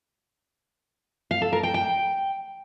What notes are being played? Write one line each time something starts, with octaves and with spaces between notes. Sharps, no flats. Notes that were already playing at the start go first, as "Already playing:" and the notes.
F5
A4
A#4
G5
G5